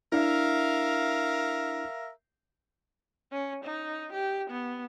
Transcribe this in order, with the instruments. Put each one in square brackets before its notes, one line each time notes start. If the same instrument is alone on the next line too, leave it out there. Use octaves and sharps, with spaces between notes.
[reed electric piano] D4 E4 [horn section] A#4 E5 F5
[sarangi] C#4
D#4
G4
B3